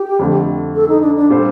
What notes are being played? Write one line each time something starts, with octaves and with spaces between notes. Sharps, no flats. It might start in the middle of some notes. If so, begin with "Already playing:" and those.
Already playing: G4
F2 D3 A3
A4
D#4
D4
D4
A#2 G3 D4 A4 C5